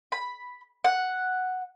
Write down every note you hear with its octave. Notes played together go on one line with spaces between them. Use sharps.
B5
F#5